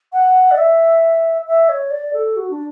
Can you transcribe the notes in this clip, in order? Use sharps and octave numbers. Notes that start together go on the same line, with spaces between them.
F#5
D5
E5
E5
C#5
D5
A4
F#4
D4